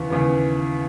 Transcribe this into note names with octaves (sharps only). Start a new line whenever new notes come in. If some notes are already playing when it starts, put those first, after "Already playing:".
Already playing: D#2 C#3 E3 B3
D#2 C#3 E3 B3